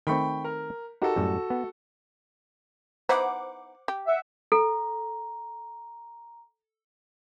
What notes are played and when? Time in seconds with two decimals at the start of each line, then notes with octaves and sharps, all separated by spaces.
0.07 D#3 A3 C4 G5 B5 C#6
0.44 A#4
1.02 D#4 F#4 G4 A4 A#4
1.16 F#2 A2 G3
1.50 B3
3.09 B3 D#4 E4 C5 F#5 D6
3.88 G4
4.06 E5 F#5
4.52 A4 A#5